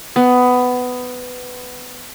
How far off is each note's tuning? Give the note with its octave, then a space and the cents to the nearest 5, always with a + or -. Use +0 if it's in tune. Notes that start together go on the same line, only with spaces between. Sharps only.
B3 +15